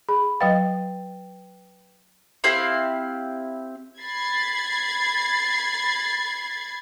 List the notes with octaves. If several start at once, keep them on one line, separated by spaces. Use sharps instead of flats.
G#4 B5
F#3 B4 D#5 F5 G5 A6
C4 E4 G4 F5
B5 G#6 A6 C7